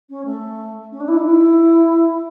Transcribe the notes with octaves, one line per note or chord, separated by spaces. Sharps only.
C#4
A3
C#4
D4
E4
D#4
E4